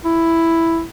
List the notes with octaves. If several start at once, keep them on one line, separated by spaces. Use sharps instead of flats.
E4